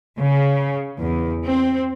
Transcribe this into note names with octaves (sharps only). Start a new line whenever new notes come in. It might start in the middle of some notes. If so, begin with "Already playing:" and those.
C#3
E2
C4